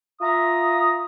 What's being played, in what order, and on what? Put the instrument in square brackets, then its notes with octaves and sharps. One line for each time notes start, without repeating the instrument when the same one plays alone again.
[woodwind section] F4 E5 A#5 D#6